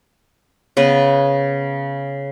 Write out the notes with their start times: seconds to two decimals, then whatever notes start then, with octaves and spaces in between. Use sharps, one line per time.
0.77 C#3 B3 B4